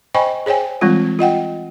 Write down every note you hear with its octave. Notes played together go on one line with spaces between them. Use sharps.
C5 D#5 G5 G#5 B5 C#6
G#4 C5 C#5 G5 G#5
E3 G3 G#3 C4 F4
F4 D#5 F#5 G5